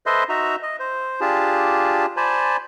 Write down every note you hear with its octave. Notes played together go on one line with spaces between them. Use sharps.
A4 B4 C5 D#5 E5 C6
D#4 F#4 E5 A#5
D#5
C5
D4 F4 G4 G#4 A5
C5 D5 G#5 A5 B5